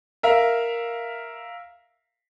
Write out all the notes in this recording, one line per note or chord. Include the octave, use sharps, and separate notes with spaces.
A#4 E5 F5